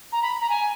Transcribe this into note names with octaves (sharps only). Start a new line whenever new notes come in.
A#5
B5
A#5
G#5